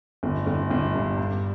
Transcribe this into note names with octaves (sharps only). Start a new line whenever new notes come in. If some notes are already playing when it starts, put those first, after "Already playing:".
G1
G1
G1
G2
G2